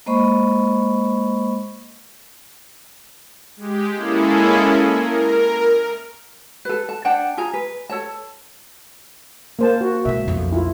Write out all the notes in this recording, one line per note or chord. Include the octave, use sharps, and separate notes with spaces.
G#3 A#3 C5 D#5 B5 C#6
G#3 G4
G#3 A#3 C#4 E4 G#4 A4
A#4
A4 B4
A5
D4 F#5 G5 A5
F4 G#4 G#5 A#5
B4
A4 C#5 A5
A#3 C5 A5
F#4
B2 G#3 E5
B1 F2
E4 F4